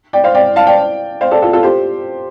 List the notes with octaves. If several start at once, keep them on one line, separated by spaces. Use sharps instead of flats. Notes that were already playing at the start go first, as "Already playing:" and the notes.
D5 G5
C5 F5
D5 G5
F5 A5
D5 G5
C5 F5
A4 D5
F4 A4
F4 A4
G4 C5